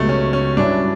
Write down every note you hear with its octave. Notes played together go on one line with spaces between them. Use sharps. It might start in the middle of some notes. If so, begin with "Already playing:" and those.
Already playing: C#2 B2 F#3 G3 A3
C#4
C#4
G2 F#3 C#4 D4 E4